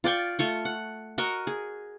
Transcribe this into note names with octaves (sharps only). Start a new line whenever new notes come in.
F4 D5 G5 C#6
A3 F4 C#6
F#5
F#4 A#4 D#5 C#6
G#4